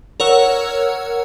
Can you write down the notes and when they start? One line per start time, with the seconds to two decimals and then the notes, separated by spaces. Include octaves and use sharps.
0.20 A#4 C#5 F#5 E6